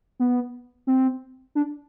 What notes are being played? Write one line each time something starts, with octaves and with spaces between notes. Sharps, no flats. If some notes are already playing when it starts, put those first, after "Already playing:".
B3
C4
D4